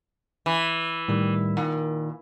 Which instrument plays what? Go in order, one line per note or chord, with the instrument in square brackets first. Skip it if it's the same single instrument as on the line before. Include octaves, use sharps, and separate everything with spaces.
[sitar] E3
[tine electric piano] A2 D#3 G3
[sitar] A#2 [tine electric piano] D#3